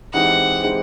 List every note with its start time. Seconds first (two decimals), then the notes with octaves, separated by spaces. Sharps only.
0.13 E3 G#3 C4 D#4 G4 F#5
0.63 E3 G#3 C4 D#4 G4